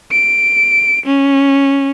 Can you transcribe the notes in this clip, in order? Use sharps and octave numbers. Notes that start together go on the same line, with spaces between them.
D7
C#4